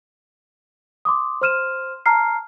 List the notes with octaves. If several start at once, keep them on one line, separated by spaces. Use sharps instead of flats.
C6 D6 D#6
C5 C6 F6 D#7 E7
A5 A#5 F6 C7